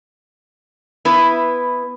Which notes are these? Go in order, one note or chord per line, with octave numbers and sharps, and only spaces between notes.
B3 E4 B4